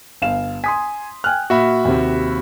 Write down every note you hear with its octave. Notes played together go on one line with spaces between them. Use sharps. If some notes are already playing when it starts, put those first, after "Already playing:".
G1 F5 E7
G#5 C6 D#6 B6
G5 G#5 F6 F#6
A#2 F#4 E5 B5
D#2 C3